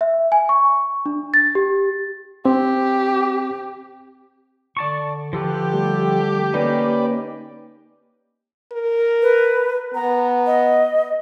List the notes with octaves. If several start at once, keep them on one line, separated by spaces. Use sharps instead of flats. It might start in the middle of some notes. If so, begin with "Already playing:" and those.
E5
G#5
C#6
D4
A6
G4
C4 G4
D3 D5 A5 C#6
F3 G4 A4 B4
G3 A3
A#3 C#4 D#4 B4 D5
A#4
B4
B3 A#5
D#5